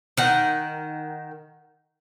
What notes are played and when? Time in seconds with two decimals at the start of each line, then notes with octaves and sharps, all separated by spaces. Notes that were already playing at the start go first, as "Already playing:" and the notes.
0.17 D#3 F#5